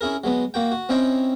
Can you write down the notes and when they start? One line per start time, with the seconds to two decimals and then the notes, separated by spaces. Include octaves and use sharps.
0.01 C#4 E4 G#4 A#4
0.24 F#3 G#3 B3
0.54 A#3 F#4 G5
0.72 F#4
0.89 C4 C#4 E4 C#5 D#5 G5